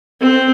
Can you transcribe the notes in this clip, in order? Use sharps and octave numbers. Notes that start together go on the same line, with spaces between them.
C4